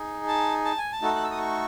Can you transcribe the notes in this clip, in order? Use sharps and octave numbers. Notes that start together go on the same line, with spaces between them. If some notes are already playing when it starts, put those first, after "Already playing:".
Already playing: D#4 G#4
A5
A5
G#5
A5
A3 D#4 F#4 A4
F#6
E6
D#6
C#6